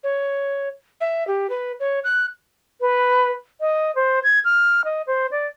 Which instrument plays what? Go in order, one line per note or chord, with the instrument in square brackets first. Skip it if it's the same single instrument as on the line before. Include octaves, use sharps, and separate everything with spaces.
[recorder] C#5
E5
G4
B4
C#5
F#6
[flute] B4
D#5
C5
G#6
F6
D#5
C5
D5